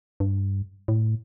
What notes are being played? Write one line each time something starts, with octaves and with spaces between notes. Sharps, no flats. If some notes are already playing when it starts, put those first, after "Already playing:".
G2
A2